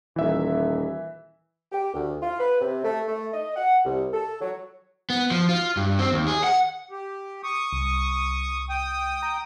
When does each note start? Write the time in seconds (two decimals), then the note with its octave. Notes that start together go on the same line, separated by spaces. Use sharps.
0.16 D#1 E3 E5
1.72 G4
1.94 D2
2.22 F4
2.39 B4
2.61 C3
2.84 A3
3.08 A3
3.33 D#5
3.56 F#5
3.85 C2
4.13 A4
4.41 F#3
5.10 B3
5.31 F3
5.49 F4
5.77 G2
5.99 C4
6.12 D#2
6.27 G#4
6.44 F#5
6.91 G4
7.43 C#6 D#6
7.73 C2
8.69 G5 D#6
9.23 A#5